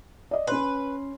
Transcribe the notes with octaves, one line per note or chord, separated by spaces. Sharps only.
D5 D#5
C#4 B4 C#5 C6